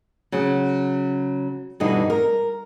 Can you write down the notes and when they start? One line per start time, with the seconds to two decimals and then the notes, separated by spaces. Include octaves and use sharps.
0.32 C#3 F#3
1.80 G2 B2 D3 E3 D#4
2.10 A#4